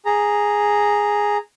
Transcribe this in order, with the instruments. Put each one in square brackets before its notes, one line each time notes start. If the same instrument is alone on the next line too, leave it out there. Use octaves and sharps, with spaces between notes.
[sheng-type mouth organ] G#4 A#5